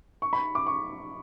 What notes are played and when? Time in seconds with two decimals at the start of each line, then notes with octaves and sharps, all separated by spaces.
0.22 C#6
0.33 B5
0.55 D6
0.67 C#6